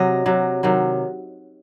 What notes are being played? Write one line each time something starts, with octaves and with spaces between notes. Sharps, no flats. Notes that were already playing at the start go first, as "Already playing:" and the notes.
Already playing: C3 F#3 D#5
C3 F#3
C3 D#3 F#3